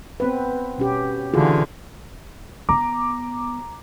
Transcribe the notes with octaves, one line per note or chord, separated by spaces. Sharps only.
B3 C4 B4
B2 C#4 G4
D3 E3 F4 F#4 G#4
B3 A#5 D6